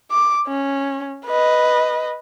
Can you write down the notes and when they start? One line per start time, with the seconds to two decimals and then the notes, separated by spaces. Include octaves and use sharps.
0.11 D6
0.48 C#4
1.26 B4 D#5